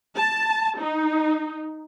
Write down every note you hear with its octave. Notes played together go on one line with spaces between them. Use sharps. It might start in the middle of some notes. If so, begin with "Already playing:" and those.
A5
D#4